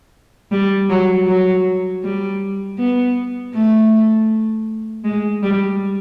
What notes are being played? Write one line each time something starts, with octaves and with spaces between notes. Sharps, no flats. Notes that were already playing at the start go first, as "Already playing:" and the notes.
G3
F#3
F#3
G3
B3
A3
G#3
G3